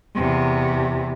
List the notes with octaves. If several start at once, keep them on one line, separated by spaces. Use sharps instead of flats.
E2 C3